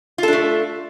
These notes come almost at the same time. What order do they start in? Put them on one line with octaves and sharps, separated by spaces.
F4 A4 D4 A3